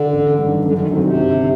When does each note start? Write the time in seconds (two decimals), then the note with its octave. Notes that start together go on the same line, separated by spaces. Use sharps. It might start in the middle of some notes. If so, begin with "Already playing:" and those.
Already playing: D3
0.13 A1
0.39 G2 D#3
0.65 F#2 D3
0.78 D#3
0.90 D3 D#3 F#3 C4 D#4
1.03 C3
1.16 G1